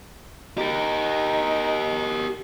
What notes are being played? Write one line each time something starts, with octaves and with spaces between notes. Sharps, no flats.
D#4 G4 A#4